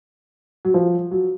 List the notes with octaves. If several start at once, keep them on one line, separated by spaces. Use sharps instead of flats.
F#3
F3
F#3